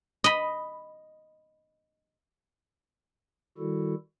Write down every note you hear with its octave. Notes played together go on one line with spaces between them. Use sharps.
D#5 B5
D#3 G3 E4 F#4 A4